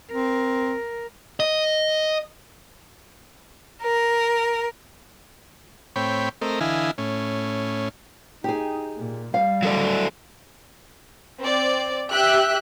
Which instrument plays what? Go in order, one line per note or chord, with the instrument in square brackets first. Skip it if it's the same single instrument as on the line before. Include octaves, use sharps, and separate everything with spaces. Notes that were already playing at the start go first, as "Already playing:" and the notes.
[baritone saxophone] C4 [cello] A#4
[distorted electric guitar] D#5
[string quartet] A#4
[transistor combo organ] A2 C4 C#5 G5 B5
A3 C4 A#4 D#5
D3 E3 E4 D#5 F5 G#5
A2 C#4
[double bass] D#4 [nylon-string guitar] G4 G#4
[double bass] A#2
[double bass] G3 [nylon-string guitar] F5
[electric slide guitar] F#3 A4 D5
[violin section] C4 D5
[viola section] G4 E5 [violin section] G5 F#6